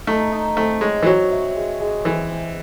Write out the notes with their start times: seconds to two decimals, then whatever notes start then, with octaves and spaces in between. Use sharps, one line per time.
0.07 A3 D#4
0.32 D#4
0.56 A3 C4
0.81 G#3 C#5
1.03 E3
1.06 F#3 C4
1.31 E5
1.56 G#3
1.81 G#3
2.05 E3 C4
2.30 C4